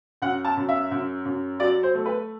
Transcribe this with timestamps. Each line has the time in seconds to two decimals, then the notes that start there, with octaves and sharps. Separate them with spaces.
0.22 F#2 F#5
0.45 A5
0.57 F#2
0.69 E5
0.91 F#2
1.25 F#2
1.60 F#3 D5
1.83 C5
1.95 A3
2.06 B4